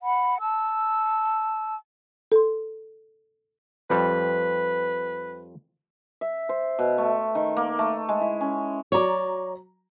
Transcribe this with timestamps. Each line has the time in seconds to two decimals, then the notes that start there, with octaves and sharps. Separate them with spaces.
0.02 F#5 B5
0.40 A5 E6
2.32 A4 C6
3.90 F2 G3 B4
6.21 E5
6.49 C5
6.79 B2
6.98 A3
7.35 D#3
7.57 A#3
7.79 A3
8.09 G#3
8.21 E4
8.41 C#4
8.92 F#3 C#5 D5 A#5